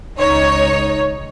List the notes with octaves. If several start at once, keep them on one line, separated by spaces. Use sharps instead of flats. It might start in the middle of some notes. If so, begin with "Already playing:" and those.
C#2 D#4 C#5